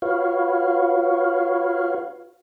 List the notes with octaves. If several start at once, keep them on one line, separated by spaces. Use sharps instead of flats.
F4 F#4 B4 C#5 F5